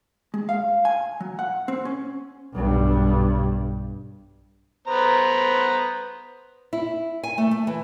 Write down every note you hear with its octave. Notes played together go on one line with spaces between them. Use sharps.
G#3
F5
G#5
F#3
F#5
C4
C#4
B1 G2
B3 C5 A#5
E4
G#5
A3
A3
E3